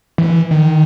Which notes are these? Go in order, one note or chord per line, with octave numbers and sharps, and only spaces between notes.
E3
D#3